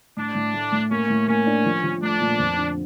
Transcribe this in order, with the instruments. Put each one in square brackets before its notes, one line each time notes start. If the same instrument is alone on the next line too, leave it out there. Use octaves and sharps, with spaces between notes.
[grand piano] A2 [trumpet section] D4
[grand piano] A2
A3
A2
[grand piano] A#3 [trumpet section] C#4
[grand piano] A2
[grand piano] A#3 [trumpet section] C#4
[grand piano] D4
F3
F3
[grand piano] A3 [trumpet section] D4
[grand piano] A#2
F2
D3